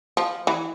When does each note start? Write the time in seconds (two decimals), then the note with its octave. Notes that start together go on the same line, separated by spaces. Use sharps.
0.17 F3
0.47 E3